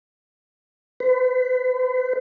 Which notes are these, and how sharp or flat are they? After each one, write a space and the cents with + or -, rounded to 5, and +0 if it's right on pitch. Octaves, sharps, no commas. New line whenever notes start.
B4 +45